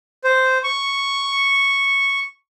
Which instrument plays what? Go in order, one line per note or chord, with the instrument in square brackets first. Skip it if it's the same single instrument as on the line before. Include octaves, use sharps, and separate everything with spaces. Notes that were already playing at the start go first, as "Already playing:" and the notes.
[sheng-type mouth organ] C5
C#6